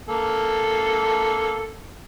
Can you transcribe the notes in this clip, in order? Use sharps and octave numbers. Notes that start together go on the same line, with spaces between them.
A#3 A4